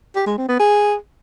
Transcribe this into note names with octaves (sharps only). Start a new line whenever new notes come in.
G4
G#3
C4
B3
G#4